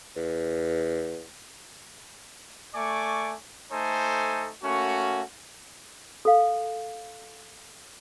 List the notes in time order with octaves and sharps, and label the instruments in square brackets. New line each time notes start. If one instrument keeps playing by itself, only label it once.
[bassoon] E2
[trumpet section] A3 D5 G#5 C#6 D6
A3 D#4 A4 C5 G#5
A3 A#3 C#4 F#4
[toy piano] A4 F5